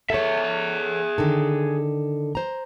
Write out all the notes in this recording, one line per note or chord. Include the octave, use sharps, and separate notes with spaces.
G#4 A4 C#5 E5
D3 D#3 A4
C5 A#5